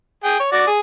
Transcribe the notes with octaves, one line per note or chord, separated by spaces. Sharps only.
G#4 G5
C#5
F#4 D5
G#4